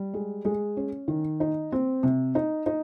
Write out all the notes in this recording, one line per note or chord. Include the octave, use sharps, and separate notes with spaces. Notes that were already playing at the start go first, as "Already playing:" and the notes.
Already playing: G3
G#3
G#3
C#4
D#3
D#4
C4
C3
D#4
D#4